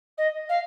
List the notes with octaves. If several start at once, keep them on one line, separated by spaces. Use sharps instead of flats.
D#5
F5